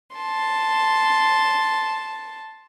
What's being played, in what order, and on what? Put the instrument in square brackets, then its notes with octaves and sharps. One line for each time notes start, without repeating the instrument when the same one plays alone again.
[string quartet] A5 C6